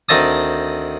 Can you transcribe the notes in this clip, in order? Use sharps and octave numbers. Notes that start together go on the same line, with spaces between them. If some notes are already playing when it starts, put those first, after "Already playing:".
D2 D#3 C4 D#5 A5 D#6